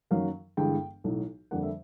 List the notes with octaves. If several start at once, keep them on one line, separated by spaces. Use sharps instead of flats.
F#2 D#3 F#3 A#3 F5
G1 G2 E3 G#3 G5
B1 A2 F#3
F2 D3 G3 A#3 F#5
E5